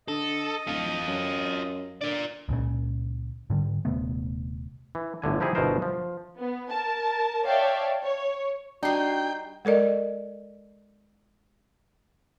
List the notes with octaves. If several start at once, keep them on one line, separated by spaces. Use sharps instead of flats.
D3 A4 D#5
D1 F4 A4
F#2
D3 A#4 D5
C#2 A#2 C#3
G#2 D3 G3
D#1 C3 A3 B3
E3
G1 A2 D3 G#5
F3 D#4 E4 G4 G#4
G1 B2 E3 B3 A#4 C5
F3
B3
A#4 A5
C#5 D5 E5 F5 G5 A5
C#5
G3 D4 D#4 F#4 G5 C7
G#3 A4 A#4 D5 D#5